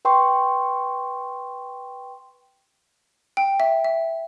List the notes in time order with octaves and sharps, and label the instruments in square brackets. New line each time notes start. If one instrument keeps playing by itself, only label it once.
[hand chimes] B4 G5 C6 C#6
[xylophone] G5
E5
E5